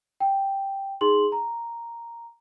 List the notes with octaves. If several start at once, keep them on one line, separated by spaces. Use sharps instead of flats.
G5
D#4 G#4 C6 F#7
A#5